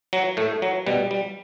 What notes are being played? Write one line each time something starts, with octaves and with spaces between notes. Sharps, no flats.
F#3
A2 A3
F#3
B2 G3
G3